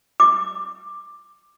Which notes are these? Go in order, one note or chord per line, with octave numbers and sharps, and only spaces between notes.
D6